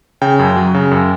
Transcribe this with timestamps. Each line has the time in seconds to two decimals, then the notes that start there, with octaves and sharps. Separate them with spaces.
0.22 C#3 G5
0.39 F#2
0.56 F#3
0.74 C#3
0.91 F#2